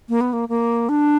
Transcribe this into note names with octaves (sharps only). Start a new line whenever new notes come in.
A#3
B3
A#3
A#3
D4